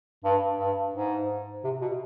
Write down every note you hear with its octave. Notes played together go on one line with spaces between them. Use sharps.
G2
G2
G#2
C3
B2